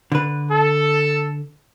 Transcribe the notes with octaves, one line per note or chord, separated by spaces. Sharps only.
D3 B4
A4